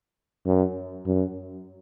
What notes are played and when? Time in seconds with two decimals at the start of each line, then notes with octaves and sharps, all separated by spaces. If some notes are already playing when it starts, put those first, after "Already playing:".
0.46 F#2
1.06 F#2